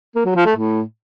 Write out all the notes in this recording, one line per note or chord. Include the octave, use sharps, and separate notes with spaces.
A#3
F#3
F3
A3
A2